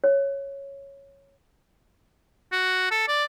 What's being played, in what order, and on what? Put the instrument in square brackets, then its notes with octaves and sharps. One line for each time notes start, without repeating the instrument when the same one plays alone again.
[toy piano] C#5
[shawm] F#4
A4
D5